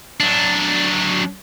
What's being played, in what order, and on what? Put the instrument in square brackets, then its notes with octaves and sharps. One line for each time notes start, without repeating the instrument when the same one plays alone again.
[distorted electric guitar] F#3 D4